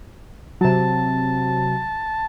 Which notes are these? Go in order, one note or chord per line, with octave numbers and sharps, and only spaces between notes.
C3 F#3 A5